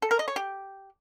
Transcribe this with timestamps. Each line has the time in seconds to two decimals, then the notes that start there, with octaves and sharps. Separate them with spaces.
0.02 A4
0.11 A#4
0.19 D#5
0.28 C#5
0.36 G4